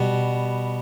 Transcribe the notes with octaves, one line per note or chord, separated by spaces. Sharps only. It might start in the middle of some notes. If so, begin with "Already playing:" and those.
Already playing: B2 G3 B3